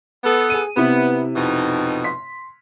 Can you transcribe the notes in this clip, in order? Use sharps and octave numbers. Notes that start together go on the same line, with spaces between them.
B3 A4
G#4 D#7
C3 B3 E4
F2 B2 D#4
C6 B6